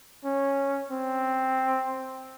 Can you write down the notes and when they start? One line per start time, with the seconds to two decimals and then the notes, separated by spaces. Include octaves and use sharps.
0.25 C#4
0.90 C4